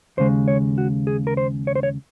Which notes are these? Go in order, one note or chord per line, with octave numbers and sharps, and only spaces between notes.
D#2 C#3 G#3 C5
C#5
F#4
G#4
A#4
C5
C#5
C5
C#5